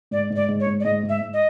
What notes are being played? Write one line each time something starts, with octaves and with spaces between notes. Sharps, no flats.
G#2 D5
G#2
D5
G#2
C#5
G#2
D5
G#2 D#5
G#2
E5
G#2
D#5